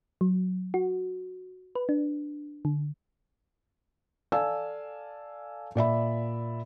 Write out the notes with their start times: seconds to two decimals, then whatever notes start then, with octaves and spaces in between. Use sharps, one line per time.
0.21 F#3
0.74 F#4
1.75 B4
1.89 D4
2.65 D3
4.32 A4 D5 F5 G#5 A5 E6
5.75 A#2 D5 E5 B5